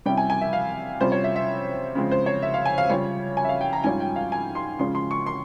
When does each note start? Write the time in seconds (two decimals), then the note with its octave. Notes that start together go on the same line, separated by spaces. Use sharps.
0.06 C3 G3 C#4 E4 G5
0.17 G#5
0.30 G#5
0.41 E5
0.53 F5
1.01 C3 G3 C#4 F4 C5
1.12 C#5
1.24 E5
1.36 E5
1.95 C#3 F3 G#3 C4
2.11 C5
2.26 C#5
2.42 E5
2.54 F5
2.66 G#5
2.78 F5
2.89 C#3 G3 C#4 F4 C#5
3.37 G#5
3.44 E5
3.49 F5
3.61 G5
3.73 A#5
3.84 G#2 G3 C#4 F4 G#5
4.00 G5
4.16 F5
4.32 G#5
4.55 C6
4.79 C#3 F3 G#3 C#4 C6
4.95 C6
5.11 C#6
5.26 C6